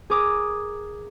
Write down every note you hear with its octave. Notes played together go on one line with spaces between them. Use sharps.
G#4 A#4 D6 D#6